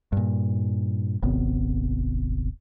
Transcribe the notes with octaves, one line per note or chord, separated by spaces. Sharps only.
G2 A#2
D#1 G#1 C3 B3